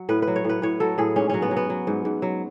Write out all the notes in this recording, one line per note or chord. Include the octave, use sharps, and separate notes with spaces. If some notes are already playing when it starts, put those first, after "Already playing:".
Already playing: F#3
A2 B4
B4
F#3
C#5
A2
B4
A2 C#5
F#3 A4
A2 G#4
G#2 C#4
F#3 C#4
B3
F#3
B3
F#3
G#2
G#2
F#3